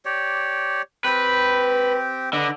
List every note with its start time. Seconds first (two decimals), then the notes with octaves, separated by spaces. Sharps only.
0.05 G4 C#5 D5
1.05 C4 G4 B4 G5
2.33 D3 B4 D#5